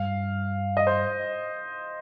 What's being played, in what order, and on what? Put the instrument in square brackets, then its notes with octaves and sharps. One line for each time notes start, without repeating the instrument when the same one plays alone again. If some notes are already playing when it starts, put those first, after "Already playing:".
Already playing: [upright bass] G2 [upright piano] F5
[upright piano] D#5
C5